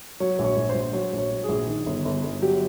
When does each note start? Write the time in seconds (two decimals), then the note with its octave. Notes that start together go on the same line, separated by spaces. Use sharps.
0.20 F#3 C#5
0.39 A#1 C#5
0.57 A#1
0.69 C5
0.75 A#1
0.93 F#3 C#5
1.13 A#1
1.18 C#5
1.31 F#3
1.44 A#1 G#4
1.67 D#3
1.86 G1
2.05 G1
2.24 G1
2.42 F#3 G4